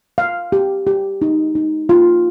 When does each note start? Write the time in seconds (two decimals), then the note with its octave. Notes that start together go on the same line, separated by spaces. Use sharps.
0.18 F5
0.52 G4
0.87 G4
1.22 D#4
1.55 D#4
1.89 F4